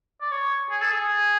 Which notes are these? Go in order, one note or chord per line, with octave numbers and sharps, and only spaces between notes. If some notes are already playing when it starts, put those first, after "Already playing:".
D5
C#5
G#4
A4
G#4